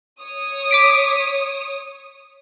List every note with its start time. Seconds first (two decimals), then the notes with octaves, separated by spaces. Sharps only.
0.21 C#5 D#6
0.71 D6 B6 D7